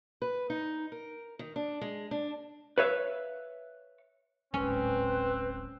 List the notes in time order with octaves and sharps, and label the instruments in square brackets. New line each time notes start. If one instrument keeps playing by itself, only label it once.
[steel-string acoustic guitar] B4
D#4
A#4
D#3
D4
G#3
D4
[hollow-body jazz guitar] B4 C#5 E5 F5
[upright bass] D1 G#1 [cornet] C4 [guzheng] C#4 [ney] B4